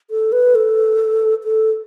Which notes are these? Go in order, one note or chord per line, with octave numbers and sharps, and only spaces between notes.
A4
B4
A4
A4